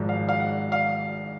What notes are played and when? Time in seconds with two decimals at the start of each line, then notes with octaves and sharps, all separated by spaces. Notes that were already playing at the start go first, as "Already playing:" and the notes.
Already playing: G#1 G#2 F3 G#3
0.09 F5
0.29 F5
0.40 F#5
0.72 F5